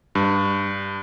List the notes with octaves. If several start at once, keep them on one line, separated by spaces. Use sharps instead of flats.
G2